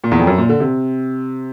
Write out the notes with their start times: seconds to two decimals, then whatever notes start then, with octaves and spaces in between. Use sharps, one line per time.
0.04 A#2
0.11 E2
0.19 F2
0.27 F#2
0.38 A#2
0.49 D3
0.60 C3